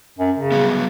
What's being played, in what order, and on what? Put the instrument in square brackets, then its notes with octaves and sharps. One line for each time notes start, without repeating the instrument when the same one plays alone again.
[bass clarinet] F#2
C#3
[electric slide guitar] F#3 G3 B3